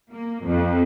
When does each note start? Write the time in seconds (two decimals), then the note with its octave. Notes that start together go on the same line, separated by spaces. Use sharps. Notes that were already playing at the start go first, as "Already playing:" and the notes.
0.12 A#3
0.45 F2